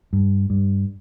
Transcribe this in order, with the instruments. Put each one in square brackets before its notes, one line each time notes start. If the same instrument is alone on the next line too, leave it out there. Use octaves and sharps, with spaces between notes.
[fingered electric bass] G2
G2